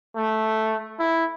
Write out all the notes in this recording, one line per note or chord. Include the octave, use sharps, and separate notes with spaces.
A3
E4